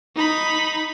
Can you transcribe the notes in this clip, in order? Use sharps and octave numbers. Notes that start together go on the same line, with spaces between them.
D#4 B5